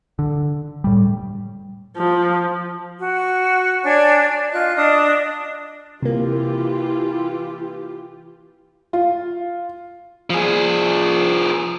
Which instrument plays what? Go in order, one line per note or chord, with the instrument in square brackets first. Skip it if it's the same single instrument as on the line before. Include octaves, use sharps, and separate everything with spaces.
[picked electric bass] D3
A2 G3
[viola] F3
[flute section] F#4
D4 C#5 D5 G#5
F4 D#5 F#6
D4 D#5 D#6
[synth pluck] C3 A#3 [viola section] E3 F4 G4
[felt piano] F4
[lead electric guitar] F3 G#4